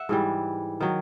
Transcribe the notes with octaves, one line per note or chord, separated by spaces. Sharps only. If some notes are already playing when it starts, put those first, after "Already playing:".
Already playing: E5 F#5
G#2 E3 G3
D#3 F#3